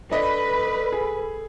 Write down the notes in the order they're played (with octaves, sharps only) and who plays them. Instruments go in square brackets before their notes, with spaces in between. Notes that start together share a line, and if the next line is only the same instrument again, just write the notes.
[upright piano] D4 D#5 [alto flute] A4 [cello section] B4
[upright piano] G#4